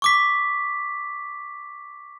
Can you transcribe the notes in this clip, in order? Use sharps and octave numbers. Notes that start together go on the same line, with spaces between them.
C#6 D6 B6